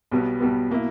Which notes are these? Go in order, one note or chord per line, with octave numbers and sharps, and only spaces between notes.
B1 B2 G3 B3
B1 B2 G3 B3
B2 A#3 E4